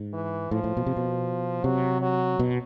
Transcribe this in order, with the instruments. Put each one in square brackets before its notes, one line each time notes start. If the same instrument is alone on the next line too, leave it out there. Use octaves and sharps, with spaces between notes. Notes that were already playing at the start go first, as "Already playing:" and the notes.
Already playing: [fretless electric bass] G#2
[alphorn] E3
[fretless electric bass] A2 [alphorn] F3
[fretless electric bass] A2
B2
C3
B2
[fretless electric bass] C3 [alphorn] F#3
[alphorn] F#3
[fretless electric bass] B2